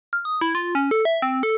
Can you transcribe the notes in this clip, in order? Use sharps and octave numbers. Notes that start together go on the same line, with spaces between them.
F6
D#6
E4
F4
C#4
A4
E5
C4
A4